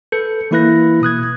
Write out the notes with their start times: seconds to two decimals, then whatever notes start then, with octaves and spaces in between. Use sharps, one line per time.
0.12 A4 B4 G6 C#7
0.51 E3 A#3 E4 B4 F#6 A#6
1.02 B2 D#6 F#6 G#6